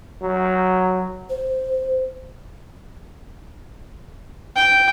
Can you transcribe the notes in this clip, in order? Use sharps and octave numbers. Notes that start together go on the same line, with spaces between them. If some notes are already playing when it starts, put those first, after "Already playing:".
F#3
C5
G5